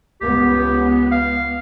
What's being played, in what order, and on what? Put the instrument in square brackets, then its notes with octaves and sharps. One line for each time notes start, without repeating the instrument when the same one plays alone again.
[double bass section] C#2 B3 [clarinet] G4
[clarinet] F5